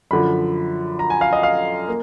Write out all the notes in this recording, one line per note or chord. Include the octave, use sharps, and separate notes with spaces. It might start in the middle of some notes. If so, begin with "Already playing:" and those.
F#2 D3 F3 B5
A#5
G#5
F5
D#5
F5
A#3